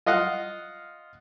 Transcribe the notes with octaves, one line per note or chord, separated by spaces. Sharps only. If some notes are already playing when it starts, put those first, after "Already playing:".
F4 D#5 F5 F#5